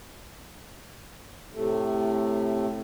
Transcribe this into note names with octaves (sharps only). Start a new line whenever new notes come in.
A2 C3 A3